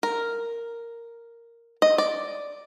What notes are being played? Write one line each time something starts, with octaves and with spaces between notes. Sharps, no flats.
A#4
D#5
D5